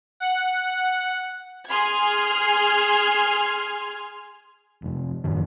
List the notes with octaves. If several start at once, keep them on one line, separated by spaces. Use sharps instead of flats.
F#5
G#4 C6 F6 G#6
F1 F2
F#2 A2 D#3